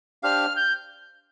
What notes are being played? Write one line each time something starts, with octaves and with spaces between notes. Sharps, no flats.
D4 G4 C5 F5 F6
G6